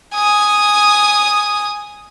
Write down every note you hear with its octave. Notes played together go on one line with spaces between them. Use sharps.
G#5 D#6